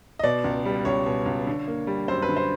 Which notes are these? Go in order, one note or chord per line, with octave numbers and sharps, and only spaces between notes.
D#5
B2 D5
C#2
G3
C#2 C#5
B2
C#2
D3
A#3
G3
F#2 C5
B4
D3
C5